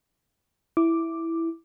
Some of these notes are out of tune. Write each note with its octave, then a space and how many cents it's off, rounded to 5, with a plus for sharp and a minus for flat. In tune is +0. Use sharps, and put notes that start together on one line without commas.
E4 +0 D6 +0